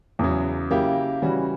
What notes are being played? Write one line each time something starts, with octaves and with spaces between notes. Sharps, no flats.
E2 C#3 F#3
C#3 F#3 A#3 E4 G4
C#3 E3 G3 C#4 F#4